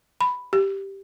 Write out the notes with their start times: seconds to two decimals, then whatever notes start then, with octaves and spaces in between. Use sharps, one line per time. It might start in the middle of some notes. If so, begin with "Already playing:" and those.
0.21 B5
0.53 G4